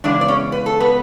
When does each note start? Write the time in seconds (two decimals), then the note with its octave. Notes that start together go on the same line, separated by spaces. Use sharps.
0.04 E2 C#3 G#3 D4 D5
0.21 D5
0.28 C#4 C#5
0.52 B4
0.66 A4
0.80 B3 B4